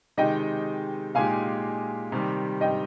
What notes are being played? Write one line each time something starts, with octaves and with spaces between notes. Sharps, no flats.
C3 D#3 G#3 D#4 G4 D#5 G5
A#2 G#3 D#4 G4 F5 G#5
C3 D#3 G3
D#5 G5